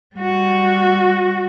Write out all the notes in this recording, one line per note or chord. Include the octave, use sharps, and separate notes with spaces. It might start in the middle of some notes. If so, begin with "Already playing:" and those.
G3 F#4